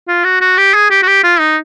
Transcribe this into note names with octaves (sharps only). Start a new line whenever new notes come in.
F4
F#4
F#4
G4
G#4
G4
F#4
G4
F4
D#4